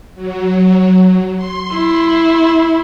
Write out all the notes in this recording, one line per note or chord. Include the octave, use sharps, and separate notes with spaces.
F#3
C6
E4